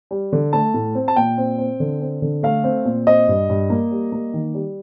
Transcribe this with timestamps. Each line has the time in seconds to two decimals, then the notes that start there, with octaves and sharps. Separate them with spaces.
0.11 G3
0.33 D3
0.53 A3 A5
0.74 A2
0.95 C4
1.08 A5
1.16 A#2 G5
1.38 C4
1.58 C4
1.80 D3
2.01 C4
2.22 D3
2.43 A3 F5
2.64 C4
2.85 A#2
3.07 C4 D#5
3.28 G2
3.50 G2
3.70 A#3
3.91 G3
4.12 A#3
4.34 D#3
4.54 G3